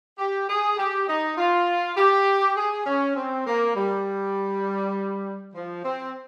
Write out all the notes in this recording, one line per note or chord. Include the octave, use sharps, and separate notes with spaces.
G4
G#4
G4
D#4
F4
G4
G#4
C#4
C4
A#3
G3
F3
C4